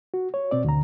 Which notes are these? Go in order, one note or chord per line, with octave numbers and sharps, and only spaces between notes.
F#4
C#5
B2 C4 D5
D2 D3 A#5